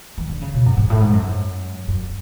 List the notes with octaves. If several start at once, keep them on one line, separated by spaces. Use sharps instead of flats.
E3
D3
C#3
B2
F#2
G#2
A2
G#2
F#2
F#2